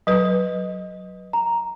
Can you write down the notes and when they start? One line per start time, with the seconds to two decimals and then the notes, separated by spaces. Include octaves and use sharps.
0.07 F#3 B4 D#5
1.33 A#5